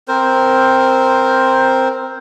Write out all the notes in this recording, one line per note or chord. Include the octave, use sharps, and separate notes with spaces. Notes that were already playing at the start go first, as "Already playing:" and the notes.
C4 A#4 C5